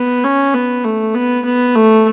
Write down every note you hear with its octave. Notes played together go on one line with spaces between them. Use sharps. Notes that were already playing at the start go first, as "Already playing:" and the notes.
Already playing: B3
C#4
B3
A3
B3
B3
A3